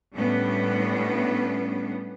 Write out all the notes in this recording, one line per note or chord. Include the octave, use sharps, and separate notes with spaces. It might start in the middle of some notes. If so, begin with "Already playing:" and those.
A2 G3 B3 C#4 D4